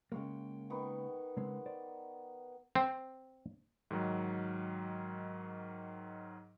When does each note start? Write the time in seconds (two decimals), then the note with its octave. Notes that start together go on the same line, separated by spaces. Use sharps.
0.12 C#3 G#3 A#3 G5 C#6
0.70 D#3 B3 C#6
1.37 C#3 G#3 C4
1.66 C5 D5
2.75 C4
3.91 G#2 D#3 F#3